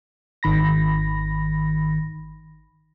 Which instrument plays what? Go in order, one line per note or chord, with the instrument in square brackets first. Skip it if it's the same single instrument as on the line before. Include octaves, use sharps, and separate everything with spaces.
[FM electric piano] G#1 D#3 B5 A#6